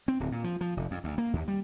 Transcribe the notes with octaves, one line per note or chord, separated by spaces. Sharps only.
C4
D1
A#2
F3
F3
F1
F2
D2
A#3
D#2
G3